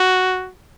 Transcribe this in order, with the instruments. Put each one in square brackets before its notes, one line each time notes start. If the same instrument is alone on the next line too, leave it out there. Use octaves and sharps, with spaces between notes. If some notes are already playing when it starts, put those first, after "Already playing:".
Already playing: [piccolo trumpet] F#4